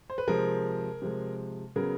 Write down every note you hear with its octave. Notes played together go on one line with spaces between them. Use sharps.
C5
B4
C3 F3 G#3 G#4 A#4
C3 F3 G#3
C#3 F#3 B3 G#4 A#4